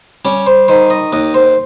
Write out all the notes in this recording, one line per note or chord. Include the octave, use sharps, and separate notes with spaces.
G3 C#4
C5
D#3 C5
D#5
D#2 D#5
C5